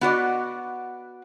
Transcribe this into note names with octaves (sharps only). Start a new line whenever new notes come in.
B3 F#4 D5 D#5